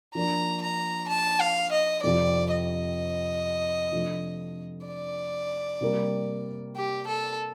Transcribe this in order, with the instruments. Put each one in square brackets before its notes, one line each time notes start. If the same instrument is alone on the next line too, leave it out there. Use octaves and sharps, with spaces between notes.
[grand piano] F3 A#3 D4 [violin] A#5
[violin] A#5
A5
F5
D#5
[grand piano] F2 C3 F3 [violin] D5
[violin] D#5
[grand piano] C3 F3 A3 D4 F4
[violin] D5
[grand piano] C3 G3 A#3
[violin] G4
A4